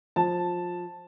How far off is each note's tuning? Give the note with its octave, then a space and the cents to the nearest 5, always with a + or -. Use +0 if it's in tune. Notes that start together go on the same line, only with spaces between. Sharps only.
F3 +20 A5 +0